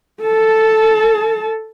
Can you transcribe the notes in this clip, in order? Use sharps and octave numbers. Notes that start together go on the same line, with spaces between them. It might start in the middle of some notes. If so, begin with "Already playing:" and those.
A4 A5